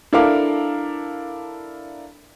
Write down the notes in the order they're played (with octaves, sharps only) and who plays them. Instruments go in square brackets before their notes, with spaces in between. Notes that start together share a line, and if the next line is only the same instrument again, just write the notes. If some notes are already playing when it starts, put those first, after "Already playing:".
[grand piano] D4 E4 A4 A#4 F5 D6